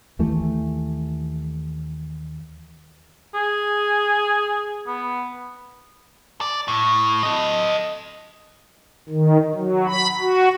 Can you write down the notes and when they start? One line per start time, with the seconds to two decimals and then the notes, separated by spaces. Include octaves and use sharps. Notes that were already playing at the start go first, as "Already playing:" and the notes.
0.19 D#2 E3 A3
3.34 G#4
4.87 B3
6.41 D5
6.68 A2
7.23 A4 D#5
9.09 D#3
9.54 F#3
9.86 B5
10.20 F#4